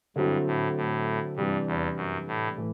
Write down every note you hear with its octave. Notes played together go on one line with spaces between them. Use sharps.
G2 D3 F#3 C4 E4
A2
A2
G2 C3 E3 G3 D4
E2
F#2
A2
A2 E3